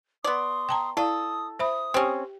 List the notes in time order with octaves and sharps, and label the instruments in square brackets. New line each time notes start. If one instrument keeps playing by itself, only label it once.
[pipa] B3 D5 [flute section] C6 C#6 D#6
[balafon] G5 A5 A#5
[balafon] E4 D5 F5 [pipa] A4 [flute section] D#6
[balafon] C5 E5 B5 [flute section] D#6
[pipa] C4 C#4 [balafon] G4 G5